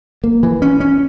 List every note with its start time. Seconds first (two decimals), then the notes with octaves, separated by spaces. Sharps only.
0.24 A#3
0.43 E3
0.62 C#4
0.80 C#4